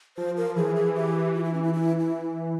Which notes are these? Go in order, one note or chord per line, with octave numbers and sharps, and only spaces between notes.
F3 C5
A#4
E3 G#4
G#4
G4
F4
E4
C#4
E4
E4
E4